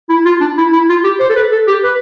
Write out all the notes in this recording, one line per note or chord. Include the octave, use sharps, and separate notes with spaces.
E4
F4
D4
E4
E4
F4
G4
C5
A4
B4
A4
G4
B4